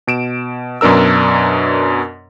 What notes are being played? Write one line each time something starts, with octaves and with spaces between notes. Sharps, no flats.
B2 D7 E7
F#2 B2 D4 A#4 E6